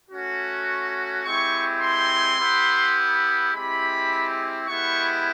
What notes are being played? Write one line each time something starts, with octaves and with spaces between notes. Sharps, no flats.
A3 C#4 F#4
C#6
G#3 C4 E4 G4 C#6
C6
B3 E4 G4
G#3 C4 E4 G4 B5
G#3 B3 E4 G4 C#6